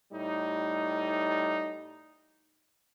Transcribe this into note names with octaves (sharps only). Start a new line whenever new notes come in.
A2 G3 D#4